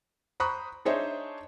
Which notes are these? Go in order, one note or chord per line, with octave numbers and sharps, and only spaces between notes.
C5 A#5 B5 C#6 D#6 F#6
D4 D#4 G#4 C5 C#5 E5